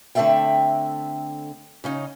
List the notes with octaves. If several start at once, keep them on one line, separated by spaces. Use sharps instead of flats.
D3 A3 C4 A4 E5 G5
C#3 C#4 D#4